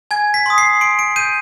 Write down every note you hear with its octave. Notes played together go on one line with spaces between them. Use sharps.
G#5 G#6
B6
C6 D#6
C7
C6 D7
D7
G6 D#7